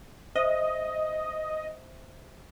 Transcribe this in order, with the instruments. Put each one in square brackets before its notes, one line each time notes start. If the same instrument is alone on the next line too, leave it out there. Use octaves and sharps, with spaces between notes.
[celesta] C5 E5 [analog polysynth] D#5